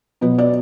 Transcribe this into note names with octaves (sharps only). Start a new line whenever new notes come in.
B2 F#3 B3 B4
D5